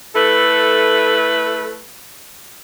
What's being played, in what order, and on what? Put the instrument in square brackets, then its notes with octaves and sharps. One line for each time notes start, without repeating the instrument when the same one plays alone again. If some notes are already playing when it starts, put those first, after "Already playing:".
[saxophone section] A3 E4 A4 B4